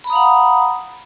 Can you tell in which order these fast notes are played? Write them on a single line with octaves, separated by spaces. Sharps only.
B5 A#5 D#6 F5 F#5